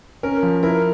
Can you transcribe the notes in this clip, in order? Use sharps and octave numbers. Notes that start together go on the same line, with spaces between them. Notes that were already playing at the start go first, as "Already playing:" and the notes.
C#4 A#4
F3
E4 A#4